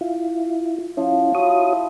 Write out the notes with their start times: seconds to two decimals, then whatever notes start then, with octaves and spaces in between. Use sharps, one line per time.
0.01 E4 F4
0.97 F3 C#4 E4
1.35 F3 E4 F#4 C#5 D#6